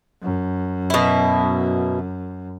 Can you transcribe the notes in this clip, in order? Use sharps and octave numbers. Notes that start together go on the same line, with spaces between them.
F#2
B2 E4